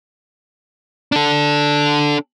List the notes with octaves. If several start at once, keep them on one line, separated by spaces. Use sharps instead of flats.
D4 A4